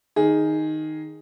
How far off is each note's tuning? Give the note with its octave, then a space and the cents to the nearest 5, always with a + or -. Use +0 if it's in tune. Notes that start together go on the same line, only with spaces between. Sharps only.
D#3 +0 G#4 +0